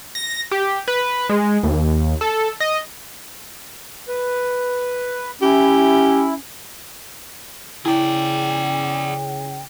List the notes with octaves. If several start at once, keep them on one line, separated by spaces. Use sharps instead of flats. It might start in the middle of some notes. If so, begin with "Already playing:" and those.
A#6
G4
B4
G#3
D#2
A4
D#5
B4
C#4 E4 G4
C#3 E4 G#4 D5 G5